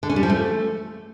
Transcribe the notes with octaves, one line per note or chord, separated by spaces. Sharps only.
D3
C#4
G3
F3
A3